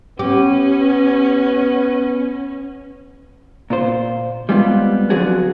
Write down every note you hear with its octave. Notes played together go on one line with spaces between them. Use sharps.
B3 C#4 G4
A#2 F4 C5
G3 G#3 B3 C4 D#4 F4
D3 F3 F#3 D4 F#4 G#4